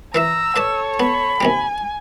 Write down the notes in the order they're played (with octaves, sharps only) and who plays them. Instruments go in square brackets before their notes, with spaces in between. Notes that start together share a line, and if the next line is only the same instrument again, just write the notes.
[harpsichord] E3 B4 E5 [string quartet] A#5 [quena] E6
[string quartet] A4 C#5 [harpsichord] B4 D5 A5
[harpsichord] B3 [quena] B5
[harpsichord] D#2 C3 G3 [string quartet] G#5